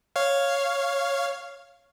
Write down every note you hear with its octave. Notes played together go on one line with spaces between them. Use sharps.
C#5 F5